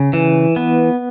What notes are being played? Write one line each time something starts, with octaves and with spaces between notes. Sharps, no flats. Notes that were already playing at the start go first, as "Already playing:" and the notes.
Already playing: C#3
E3
B3